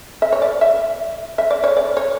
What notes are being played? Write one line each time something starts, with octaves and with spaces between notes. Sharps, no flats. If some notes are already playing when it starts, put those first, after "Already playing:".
E5
C#5
D5
E5
E5
D5
C#5
D5
C#5